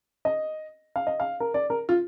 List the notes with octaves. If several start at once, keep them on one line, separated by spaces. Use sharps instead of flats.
D#5
F5
D#5
F5
A#4
D5
A#4
F4